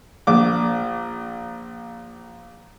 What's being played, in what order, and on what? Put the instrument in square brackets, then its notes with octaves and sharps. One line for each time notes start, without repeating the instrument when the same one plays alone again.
[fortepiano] A#1 D6